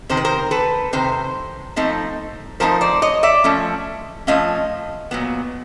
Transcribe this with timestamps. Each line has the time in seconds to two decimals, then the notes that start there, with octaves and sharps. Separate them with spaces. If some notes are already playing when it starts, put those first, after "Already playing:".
0.09 C3 D#3 C5
0.17 B4
0.25 A#4 C5
0.51 A4 B4
0.93 C3 D#3 C5
1.76 F3 A3 C4 D#4
2.60 F3 A3 C4 D#4 A#4 C5
2.81 C5 D5
3.02 C#5 D#5
3.23 D5 E5
3.44 F3 A3 C#4
4.27 F3 A3 C#4 D#5 F5
5.11 A#2 F#3 B3